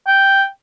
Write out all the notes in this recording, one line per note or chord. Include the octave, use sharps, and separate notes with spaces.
G5